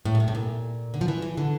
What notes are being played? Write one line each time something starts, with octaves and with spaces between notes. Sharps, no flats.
A2
A#2
C3
A2
A#2
D3
F3
E3
E3
D3